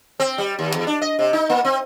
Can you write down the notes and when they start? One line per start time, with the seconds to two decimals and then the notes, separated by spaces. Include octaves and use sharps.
0.20 C4
0.38 G3
0.59 D#2
0.74 E2
0.87 D4
1.01 D#5
1.19 C3
1.33 D#4
1.50 A#3
1.65 C4